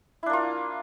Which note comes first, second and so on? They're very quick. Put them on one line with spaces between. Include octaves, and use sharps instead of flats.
E4 D4 A#3 F4